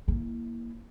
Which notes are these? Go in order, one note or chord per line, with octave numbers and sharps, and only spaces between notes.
A#3 E4